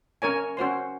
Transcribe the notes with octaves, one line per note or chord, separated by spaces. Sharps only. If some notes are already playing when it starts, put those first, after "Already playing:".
C#4 A#4 C#5 G#5
C#4 F#4 C5 C6